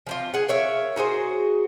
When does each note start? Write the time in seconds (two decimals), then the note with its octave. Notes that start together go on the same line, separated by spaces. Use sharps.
0.07 F3 C4 F4
0.34 G#4 F#5
0.48 A#4 C#5 E5 F5
0.96 D#4 F#4 G#4 C5